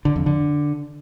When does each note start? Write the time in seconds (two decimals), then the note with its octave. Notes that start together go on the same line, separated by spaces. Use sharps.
0.05 D3
0.16 F2
0.26 D3